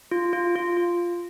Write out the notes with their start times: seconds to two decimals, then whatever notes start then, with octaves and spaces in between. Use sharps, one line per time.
0.11 F4
0.33 F4
0.56 F4
0.77 F4